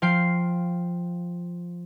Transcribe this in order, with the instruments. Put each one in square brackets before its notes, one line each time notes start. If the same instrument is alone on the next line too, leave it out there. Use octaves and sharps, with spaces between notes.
[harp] F3 F5 G5 C7